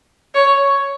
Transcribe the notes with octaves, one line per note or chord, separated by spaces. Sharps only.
C#5